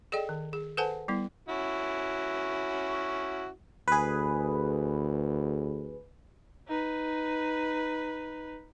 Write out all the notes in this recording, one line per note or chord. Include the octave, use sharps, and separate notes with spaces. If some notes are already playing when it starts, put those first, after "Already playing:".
G#4 A4 D5 D#5 G5
D#3
G#4
A4 B4 C5 F#5 G#5 A5
G3 B3 E4
C#4 E4 F#4
D2 G#4 B4
D#4 B4